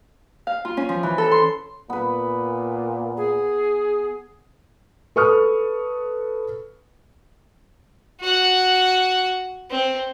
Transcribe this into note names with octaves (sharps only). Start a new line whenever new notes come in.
F5
F4
C#4
F3
E3
A4
C6
A#2 B3 B4
G#4
A4 B4 C#6 D#6 F6
F#4 F#5
C4